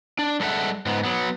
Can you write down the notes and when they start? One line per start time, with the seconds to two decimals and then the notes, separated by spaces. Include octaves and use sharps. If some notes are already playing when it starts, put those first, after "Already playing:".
0.19 D4
0.40 G3 G#3 A4 D#5 E5 F#5
0.86 G#2 B3
1.05 F#3 B3